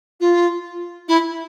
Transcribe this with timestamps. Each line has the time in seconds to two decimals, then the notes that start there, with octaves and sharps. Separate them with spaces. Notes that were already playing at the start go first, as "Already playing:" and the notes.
0.20 F4
1.08 E4